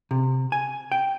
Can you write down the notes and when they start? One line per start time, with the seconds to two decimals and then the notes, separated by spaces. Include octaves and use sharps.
0.11 C3
0.52 G#5
0.92 G5